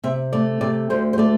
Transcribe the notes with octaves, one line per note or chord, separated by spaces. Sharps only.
C3 E5
A3 D5
C3 D5
D2 C5
C5
A3 D5